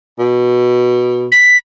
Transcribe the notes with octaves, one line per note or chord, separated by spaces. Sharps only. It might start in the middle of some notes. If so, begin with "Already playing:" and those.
B2
B6